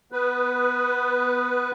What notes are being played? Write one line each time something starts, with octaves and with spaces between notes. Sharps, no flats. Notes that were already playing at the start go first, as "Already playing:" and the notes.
B3 B4